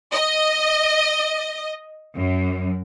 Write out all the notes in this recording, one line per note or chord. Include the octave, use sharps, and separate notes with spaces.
D#5
F#2